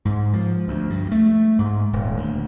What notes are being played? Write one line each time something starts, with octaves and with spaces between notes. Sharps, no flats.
G#2
F3
D2
G2
A3
G#2
D#1
D2